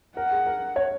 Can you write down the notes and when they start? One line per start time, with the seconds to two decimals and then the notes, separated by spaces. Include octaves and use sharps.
0.16 A#4 F#5
0.31 G#4
0.46 A#4
0.76 C#5